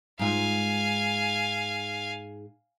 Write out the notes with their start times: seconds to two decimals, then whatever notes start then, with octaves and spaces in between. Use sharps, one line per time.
0.19 G#2 F4 F5 G#5